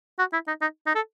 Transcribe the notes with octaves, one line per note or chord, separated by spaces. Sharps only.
F#4
E4
D#4
D#4
D#4
A4